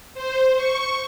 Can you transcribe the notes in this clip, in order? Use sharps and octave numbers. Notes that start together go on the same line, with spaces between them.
C5
C#6